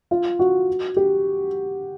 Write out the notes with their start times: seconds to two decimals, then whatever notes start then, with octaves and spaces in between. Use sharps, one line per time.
0.11 F4
0.39 F#4
0.97 G4